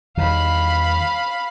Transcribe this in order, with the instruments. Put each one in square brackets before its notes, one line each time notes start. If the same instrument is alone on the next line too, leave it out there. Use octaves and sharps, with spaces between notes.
[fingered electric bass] E2 D#3 G3 [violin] F5 B5